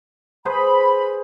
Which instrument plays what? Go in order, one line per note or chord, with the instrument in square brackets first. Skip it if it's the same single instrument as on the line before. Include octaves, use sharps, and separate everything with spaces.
[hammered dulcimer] G#4 B4 C5 [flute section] B5